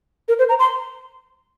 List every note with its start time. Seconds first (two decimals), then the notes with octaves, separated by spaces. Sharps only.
0.28 A#4
0.39 C5
0.49 A#5
0.59 C6